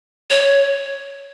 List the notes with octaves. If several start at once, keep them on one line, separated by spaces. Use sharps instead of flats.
C#5